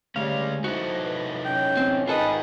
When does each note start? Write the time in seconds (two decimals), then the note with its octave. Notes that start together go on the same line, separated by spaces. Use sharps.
0.16 D2 G3 G#3 C#4 F5
0.64 D#4 E4 F#4 A4 C5
1.02 B4
1.45 C#4 G5
1.77 C4
2.07 D#3 D#4 F4 G#4 A4 B4 D#5